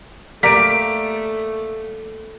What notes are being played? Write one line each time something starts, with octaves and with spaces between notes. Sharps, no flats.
A3 A#3 G4 A#4 D5 F5 B6 D7